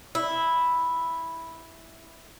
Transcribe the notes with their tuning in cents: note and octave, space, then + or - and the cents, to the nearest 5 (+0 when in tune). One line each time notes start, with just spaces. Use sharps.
E4 -5